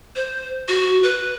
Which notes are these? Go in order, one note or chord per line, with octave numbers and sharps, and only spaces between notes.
C5
F#4
B4